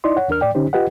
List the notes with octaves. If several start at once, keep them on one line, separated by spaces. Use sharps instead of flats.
D#4 E4 D5 D#5 C6
C#5 F#5
D#2 D4 A#4 F6
A2 D5 G5
D3 C#4 D#4 G4 C5
F4 G4 B4 D#5 F#5